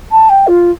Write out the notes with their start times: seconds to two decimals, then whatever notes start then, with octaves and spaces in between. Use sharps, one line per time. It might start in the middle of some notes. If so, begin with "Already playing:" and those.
0.11 A5
0.29 G5
0.47 F4